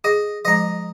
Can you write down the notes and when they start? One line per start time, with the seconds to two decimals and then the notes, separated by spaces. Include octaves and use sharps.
0.04 G#4 D#5
0.45 F3 G#3 D#5 A#5